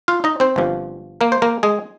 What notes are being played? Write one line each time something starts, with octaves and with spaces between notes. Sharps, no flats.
F4 F5
D#4 D#5
C4 C5
G1 G2 F3
A#3 A#4
C5
A#3 A#4
G#3 G#4